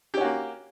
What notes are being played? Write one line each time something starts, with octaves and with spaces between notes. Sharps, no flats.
A#3 C#4 F#4 G4